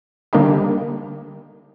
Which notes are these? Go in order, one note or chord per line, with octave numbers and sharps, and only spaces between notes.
D3 G3 A#3 D4 D#4 G4